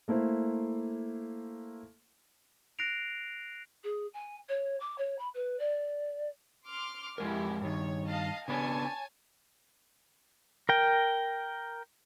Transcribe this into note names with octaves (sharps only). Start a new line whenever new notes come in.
A3 A#3 E4 C5
F#6 A#6 C7 D7 F7
G#4
G#5
C#5
D6
C#5
B5
B4
D5
C6 D6 F6
F2 G#3 E4 G4 A#4
G2 D#3 C#5
D#5 F5 A5
C#3 B3 D4 C#5 G#5 A5
A#4 G5